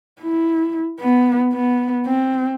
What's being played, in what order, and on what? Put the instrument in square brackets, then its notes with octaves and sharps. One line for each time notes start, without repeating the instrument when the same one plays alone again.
[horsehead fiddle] E4
B3
B3
C4